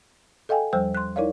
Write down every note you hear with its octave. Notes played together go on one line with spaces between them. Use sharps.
A4 D#5 F5 G5 G#5
E2 F3 G3 C5 G5 E6
C6 F#6
D#4 E4 A#4 C#5 D5 F5